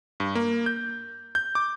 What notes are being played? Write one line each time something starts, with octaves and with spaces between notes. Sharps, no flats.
G2
A#3
G6
G6
D6